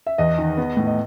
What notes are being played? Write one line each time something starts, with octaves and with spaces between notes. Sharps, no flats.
E5
E2 D#5
D#3
B3
A2
D#5